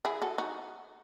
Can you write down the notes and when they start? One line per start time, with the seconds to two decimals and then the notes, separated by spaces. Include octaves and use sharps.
0.05 E4 G#4
0.22 F#4 A4
0.38 D#4 F#4